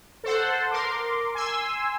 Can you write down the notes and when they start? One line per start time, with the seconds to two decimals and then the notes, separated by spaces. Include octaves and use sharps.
0.24 A4 C5 F#5
0.71 A#4 C6 D6
1.35 G#5 C6 E6